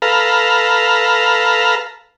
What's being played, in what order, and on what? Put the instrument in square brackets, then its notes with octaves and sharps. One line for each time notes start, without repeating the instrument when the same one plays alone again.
[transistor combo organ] A4 B4 F5 A#5